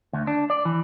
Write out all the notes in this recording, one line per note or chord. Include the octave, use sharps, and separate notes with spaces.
D2
D4
D5
E3